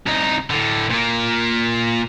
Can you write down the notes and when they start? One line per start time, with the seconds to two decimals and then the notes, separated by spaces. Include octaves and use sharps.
0.07 C2 D#4
0.50 A2 D3
0.91 A#2 A#3